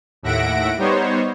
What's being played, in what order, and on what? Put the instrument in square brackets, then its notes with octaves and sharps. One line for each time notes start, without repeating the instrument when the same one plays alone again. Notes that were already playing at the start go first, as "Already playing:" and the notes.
[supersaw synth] D#2 A2 E5 F#5 A#6 D7
G3 B3 D#4 C5 C#5